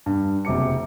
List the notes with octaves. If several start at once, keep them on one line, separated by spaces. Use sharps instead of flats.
G2
F#1 C3 D6 C#7